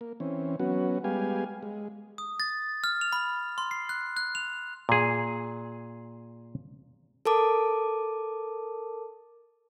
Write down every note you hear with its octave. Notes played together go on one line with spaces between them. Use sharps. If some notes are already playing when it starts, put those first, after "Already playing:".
A#3
E3 C4 C#4
F#3 B3 C#4 F#4
G3 G#3 B3 G4 F5 G#5
G#3
D#6
A6
F6
F7
B5
C6
C7
F#6
F#6
F7
A#2 G#4
A4 A#4 A5 D6